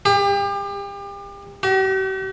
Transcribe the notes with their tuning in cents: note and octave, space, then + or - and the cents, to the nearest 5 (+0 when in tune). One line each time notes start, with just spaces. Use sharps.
G4 +35
G4 -45